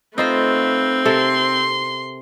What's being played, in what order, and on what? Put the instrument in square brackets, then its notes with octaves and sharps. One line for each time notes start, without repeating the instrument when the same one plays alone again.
[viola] A3 B4 [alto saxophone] C4 [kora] D#4 F4 C5
[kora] C3 A4 A#4 [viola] C6